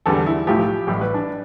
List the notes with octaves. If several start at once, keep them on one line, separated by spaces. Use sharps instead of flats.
E2 D3 G3 A4
E4
B1 A2 F3 G4
A1 A2 G3
B4
D4